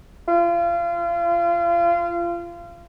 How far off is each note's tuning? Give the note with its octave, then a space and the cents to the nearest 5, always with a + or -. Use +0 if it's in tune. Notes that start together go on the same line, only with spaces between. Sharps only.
F4 -30